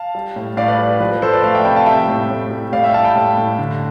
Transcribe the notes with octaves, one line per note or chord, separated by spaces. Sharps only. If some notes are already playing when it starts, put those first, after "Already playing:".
Already playing: F5 A5
G3
A2
A2 D5 F5
B4 D5
G3
B4
F3 B4
B4
F3 A4 C5
B4 D5
A3 D5 F5
E5 G5
C3 G5 B5
F5 A5
G3 E5 G5
A2
A2
G3
A2 D5 F5
E5 G5
G3 F5 A5
G5 B5
A2
A2
D3